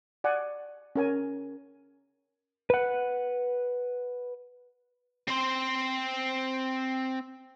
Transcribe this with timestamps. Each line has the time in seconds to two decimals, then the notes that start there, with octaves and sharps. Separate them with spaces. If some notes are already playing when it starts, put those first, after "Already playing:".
0.24 D5 F#5 G#5
0.96 C#4 A#4 G#5
2.70 B4 F#5
5.28 C4 C5